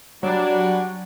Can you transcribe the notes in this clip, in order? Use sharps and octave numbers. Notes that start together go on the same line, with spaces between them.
F#3 G3 D4 F#4